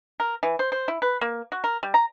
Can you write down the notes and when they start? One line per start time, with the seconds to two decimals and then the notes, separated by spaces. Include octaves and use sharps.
0.20 A#4
0.43 E3
0.59 C5
0.72 C5
0.88 E4
1.02 B4
1.21 A#3
1.52 F#4
1.64 A#4
1.83 G3
1.94 A#5